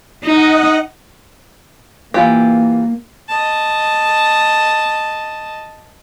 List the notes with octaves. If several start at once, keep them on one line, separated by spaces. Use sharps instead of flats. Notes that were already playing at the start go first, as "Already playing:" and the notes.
D#4 D#5 F#5
E3 A#3 F4 G4
D#5 A5